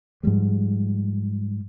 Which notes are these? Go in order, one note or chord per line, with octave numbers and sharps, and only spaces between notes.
G#2 F3 G3 G#3